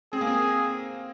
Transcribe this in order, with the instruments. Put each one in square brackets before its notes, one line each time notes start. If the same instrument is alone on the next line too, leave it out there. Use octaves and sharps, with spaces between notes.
[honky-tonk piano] C4 [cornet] G#4
[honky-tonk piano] A#3
C4